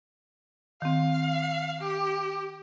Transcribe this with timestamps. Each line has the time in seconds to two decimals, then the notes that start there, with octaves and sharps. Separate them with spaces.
0.82 D#3 C4 F5
1.81 G4